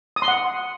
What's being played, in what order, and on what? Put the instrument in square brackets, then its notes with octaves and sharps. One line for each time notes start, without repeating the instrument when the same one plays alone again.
[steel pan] D#6
C6
F#5